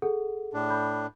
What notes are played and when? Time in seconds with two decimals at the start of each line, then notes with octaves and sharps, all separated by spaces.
0.02 G#4 A4 F#5
0.54 A2 D4
0.70 B5 G6